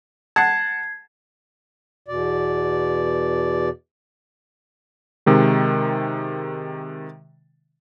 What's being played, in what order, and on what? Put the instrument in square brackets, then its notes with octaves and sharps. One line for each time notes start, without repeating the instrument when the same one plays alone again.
[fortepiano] F#5 A5 [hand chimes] G#6 C7
[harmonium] E2 B2 D5
[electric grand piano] C3 D#3 G#3